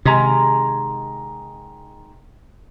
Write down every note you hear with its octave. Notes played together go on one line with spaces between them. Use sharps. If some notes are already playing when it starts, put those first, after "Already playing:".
C3 D#3 G#3 A#5